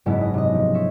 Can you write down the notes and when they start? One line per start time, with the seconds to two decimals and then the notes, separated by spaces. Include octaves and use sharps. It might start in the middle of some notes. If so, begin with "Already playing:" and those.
0.06 F#1 G#2 G#3 B3 E4 B4
0.21 D#5
0.34 C3 D#5
0.54 F3
0.74 C5 C#5 E5